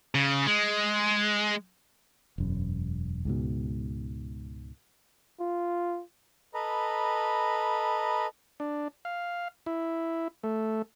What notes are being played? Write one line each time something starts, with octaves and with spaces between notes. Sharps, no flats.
C#3
G#3
E1 F#2
C#2 G#2 B2
F4
A4 B4 D#5 A#5 B5
D4
F5
E4
A3